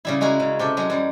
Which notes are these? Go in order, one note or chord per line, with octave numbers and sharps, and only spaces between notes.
C#3 G3 E4
G#3 E4 F#4 A#4
C#3
C3 G4 A4
F#3 G#3
F#2 G3